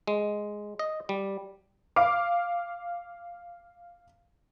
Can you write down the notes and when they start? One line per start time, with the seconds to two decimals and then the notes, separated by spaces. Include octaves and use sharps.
0.07 G#3
0.79 D#5
1.09 G3
1.96 F5 D6